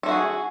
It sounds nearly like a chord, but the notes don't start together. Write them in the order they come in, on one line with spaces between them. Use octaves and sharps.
A4 E4 F#4 G#4